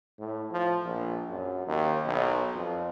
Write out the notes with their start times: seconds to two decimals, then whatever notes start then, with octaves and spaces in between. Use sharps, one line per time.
0.19 A2
0.52 F3
0.85 A#1
1.29 F#2
1.67 D#2
2.06 B1
2.55 F2